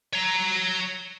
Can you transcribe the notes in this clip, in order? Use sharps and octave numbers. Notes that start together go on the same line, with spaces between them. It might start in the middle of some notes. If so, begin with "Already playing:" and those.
C#5 A#5